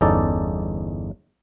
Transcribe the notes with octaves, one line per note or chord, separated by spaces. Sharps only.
G1 E2 C#4 D#4 A4 D5